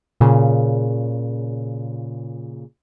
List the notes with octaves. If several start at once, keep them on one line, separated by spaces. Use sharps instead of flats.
A#2 C#3